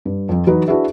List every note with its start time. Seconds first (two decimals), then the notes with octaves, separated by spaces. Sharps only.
0.05 G2
0.29 F2 F3
0.47 E3 F#3 D#4 B4
0.68 D4 E4 F#4 G#4 B4 E5